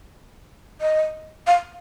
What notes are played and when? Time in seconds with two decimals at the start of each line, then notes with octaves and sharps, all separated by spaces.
0.81 D#5
1.47 F5